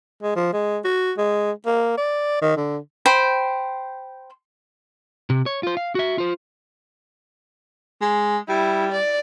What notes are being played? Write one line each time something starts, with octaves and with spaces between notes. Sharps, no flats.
G#3
F3
G#3
F#4
G#3
A#3
D5
D#3
D3
C5 G5 B5
C3
C#5
F4 C5
F5
F#4 E5
F4 C5
G#3
G3 E4
D5